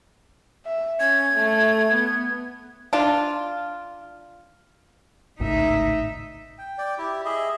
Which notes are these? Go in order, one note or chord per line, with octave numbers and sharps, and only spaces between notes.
E5
C#4 G#6
A3
B3
D4 F4
G#1 C#2 A2 D#4 E5
G5
D5 G5
E4 G4
G#4 D#5 E5